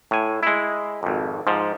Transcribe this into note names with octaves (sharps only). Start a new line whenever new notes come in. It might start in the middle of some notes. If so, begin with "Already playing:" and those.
A2 G#5
G#3 E4
G#1 F2
G#2 F3